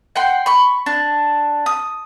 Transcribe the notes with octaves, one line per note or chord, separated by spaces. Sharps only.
F#5 G5 C6
B5 C#6
D4
D#6